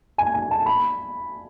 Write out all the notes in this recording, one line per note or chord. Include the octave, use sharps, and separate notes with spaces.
G#5
G#5
A5
B5